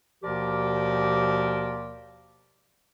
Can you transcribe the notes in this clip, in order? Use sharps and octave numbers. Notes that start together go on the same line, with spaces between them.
D#2 B2 F3 G4 A#4 D5